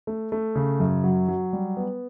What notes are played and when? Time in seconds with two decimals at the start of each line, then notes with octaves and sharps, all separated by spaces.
0.07 A3
0.32 A3
0.55 C#3
0.80 F#2
1.04 F#3
1.28 F#3
1.53 G3
1.77 B3